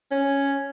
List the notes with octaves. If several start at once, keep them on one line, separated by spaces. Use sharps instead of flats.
C#4